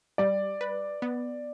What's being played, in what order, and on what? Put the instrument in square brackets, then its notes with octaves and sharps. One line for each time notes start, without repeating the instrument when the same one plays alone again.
[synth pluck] G3 [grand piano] D5
[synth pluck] B4
B3